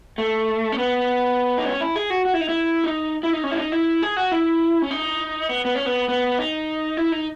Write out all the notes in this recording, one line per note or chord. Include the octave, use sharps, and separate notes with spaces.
A3
C#4
B3
D#4
C#4
E4
G#4
F#4
F#4
E4
D#4
E4
D#4
E4
D#4
C#4
E4
D#4
E4
G#4
F#4
E4
C#4
D#4
B3
B3
C#4
B3
B3
D#4
E4
D#4